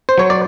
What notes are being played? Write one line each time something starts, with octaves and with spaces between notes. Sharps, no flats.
C5
F#3 C#5
D5